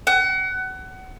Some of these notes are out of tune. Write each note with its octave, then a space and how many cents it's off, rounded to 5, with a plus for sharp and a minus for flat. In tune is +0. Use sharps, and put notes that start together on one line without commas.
F#5 +25